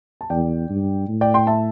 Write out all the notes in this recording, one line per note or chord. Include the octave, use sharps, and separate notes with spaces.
A5
E2 D5 G5
G2
A2
D5 G5
G5 C6
E5 A5